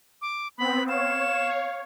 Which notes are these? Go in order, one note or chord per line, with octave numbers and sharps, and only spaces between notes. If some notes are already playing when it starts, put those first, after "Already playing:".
D6
B3 C4 B5
C#5 F5 E7